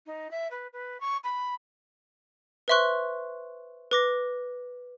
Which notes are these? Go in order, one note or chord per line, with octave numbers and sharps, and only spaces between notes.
D#4
E5
B4
B4
C#6
B5
B4 C5 E5 C6 C#6 F#6
B4 D6 A#6